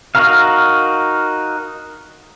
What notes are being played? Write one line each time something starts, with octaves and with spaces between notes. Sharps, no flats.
D#4 F#4 A#4 F5